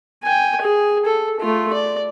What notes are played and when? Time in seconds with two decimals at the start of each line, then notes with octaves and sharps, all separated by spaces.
0.23 G5 G#5
0.61 G#4
1.05 A4
1.40 A3 F4
1.73 D5